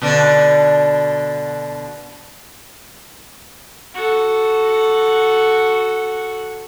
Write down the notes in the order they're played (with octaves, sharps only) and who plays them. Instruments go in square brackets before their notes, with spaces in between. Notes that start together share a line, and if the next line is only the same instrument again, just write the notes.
[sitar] B2 D3 D4
[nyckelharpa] F#4 A4